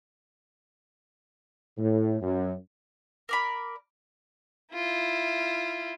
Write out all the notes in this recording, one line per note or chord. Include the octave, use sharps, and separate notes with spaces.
A2
F#2
A#4 D5 B5
E4 F4